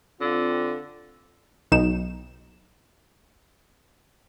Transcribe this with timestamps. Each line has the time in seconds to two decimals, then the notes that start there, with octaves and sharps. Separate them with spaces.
0.21 D3 C4 F4
1.72 B1 D#4 E7